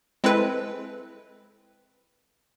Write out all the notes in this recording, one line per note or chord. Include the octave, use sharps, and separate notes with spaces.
G#3 C4 E4 A4 B4